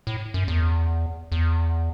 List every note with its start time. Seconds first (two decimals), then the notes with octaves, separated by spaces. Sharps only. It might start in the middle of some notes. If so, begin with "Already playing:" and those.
0.07 A2
0.34 F#2
0.48 E2
1.32 E2